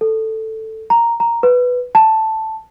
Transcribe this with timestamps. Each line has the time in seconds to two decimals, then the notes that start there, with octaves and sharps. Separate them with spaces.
0.01 A4
0.90 A#5
1.20 A#5
1.43 B4
1.95 A5